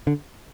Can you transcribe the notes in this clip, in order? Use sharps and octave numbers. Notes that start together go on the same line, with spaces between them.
D3